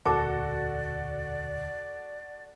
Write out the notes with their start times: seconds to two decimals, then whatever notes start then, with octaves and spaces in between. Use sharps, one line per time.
0.05 E1 D2 A#2 F#4 A4 D5 A5 D6